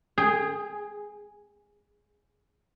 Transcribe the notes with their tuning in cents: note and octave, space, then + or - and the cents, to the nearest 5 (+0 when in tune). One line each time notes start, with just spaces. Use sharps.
G#4 +0 G5 +35